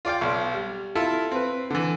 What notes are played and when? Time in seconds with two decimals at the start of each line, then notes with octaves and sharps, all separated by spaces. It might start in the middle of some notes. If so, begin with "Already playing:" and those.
0.05 F4 D5 F5 G5
0.21 B1
0.54 G3
0.95 E4 F4 A4
1.32 C4 B4
1.70 D3 E3